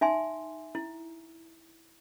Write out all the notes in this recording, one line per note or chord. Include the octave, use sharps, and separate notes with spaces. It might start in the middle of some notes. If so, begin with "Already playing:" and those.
D#4 E5 G#5 C6
E4